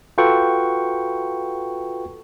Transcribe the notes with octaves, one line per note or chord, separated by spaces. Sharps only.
F4 F#4 A4 B4 G5 C#6